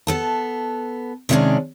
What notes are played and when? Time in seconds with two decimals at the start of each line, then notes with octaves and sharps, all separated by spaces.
0.07 B3 A4 A5
1.29 C3 D#3 G3 G#3 C#4 D4